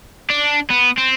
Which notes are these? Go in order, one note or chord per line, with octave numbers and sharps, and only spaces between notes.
D4
B3
C4